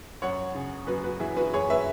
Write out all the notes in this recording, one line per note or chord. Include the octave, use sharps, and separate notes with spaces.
F#2 C#5 F#5
C#3
F#2 F#4 B4
F#4 B4
E3 E4 G#4
F#4 B4
F#2 G#4 C#5
B4 E5